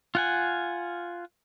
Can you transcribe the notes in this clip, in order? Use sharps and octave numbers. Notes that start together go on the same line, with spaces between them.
F4 F#5 G#5